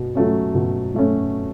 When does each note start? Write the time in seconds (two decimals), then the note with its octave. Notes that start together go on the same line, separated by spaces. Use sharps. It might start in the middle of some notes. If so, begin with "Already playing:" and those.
Already playing: B2
0.15 F#3 A3 C#4
0.55 B2
0.95 F#3 A3 C#4